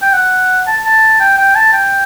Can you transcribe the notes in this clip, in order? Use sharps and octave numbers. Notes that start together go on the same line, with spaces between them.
G5
F#5
A5
A5
G5
G5
A5
G5